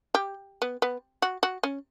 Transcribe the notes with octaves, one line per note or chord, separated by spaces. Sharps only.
G4
B3
B3
F#4
F#4
C#4